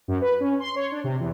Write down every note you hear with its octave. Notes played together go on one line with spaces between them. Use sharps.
F#2
B4
C#4
C6
C#5
D4
C3
E2